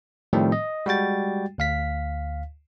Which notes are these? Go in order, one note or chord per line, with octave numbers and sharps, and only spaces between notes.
A2 D#3 F3 G3 A3 C4
D#5
G3 G#3 F#4 G5 A6
D2 F5 B6